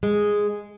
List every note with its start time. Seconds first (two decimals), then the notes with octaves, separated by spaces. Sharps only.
0.03 G#3